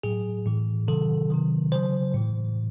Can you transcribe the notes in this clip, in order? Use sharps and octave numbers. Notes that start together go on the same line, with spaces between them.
A2 F#3 G#4
A2 E3
C3 D#3 F#3 A4
C3 D#3 F#3
C#3 F#3 C5
A2 E3